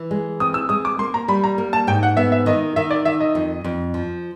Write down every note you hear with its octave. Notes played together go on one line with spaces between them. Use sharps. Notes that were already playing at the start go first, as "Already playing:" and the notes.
Already playing: E3
G#3
C4 D#6
E6
G#3 D#6
D6
A#3 C6
A#5
G3 B5
A#5
A#3
A5
G#2 G5
F#5
B3 E5
E5
D#3 D#5
D#3 E5
D5
D#3 E5
D#5
F2
F2
F3